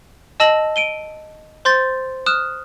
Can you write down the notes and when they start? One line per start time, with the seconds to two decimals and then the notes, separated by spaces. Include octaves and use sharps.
0.40 D#5 A5 E6 A#6 F#7
0.76 D7 D#7 G7
1.65 C5 C6 G6 A6
2.26 D#6 F6 F#6 E7